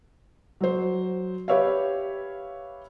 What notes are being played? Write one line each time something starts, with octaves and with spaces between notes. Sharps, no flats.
F#3 C5
G4 B4 C#5 E5 F5